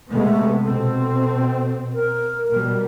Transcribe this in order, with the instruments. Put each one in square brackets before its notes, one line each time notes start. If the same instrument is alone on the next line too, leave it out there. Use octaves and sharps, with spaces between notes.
[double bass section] C3 G#3 B3 [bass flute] A3
[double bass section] B2 C4 [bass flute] A4
[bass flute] A#4
[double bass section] B2 G3 [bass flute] A#4